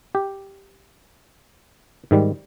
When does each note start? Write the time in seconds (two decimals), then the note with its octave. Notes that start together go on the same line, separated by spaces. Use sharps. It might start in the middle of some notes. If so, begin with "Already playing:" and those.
0.15 G4
2.11 G#2 D#3 G3